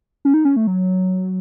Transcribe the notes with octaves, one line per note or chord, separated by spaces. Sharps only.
C#4
D#4
C#4
A3
F#3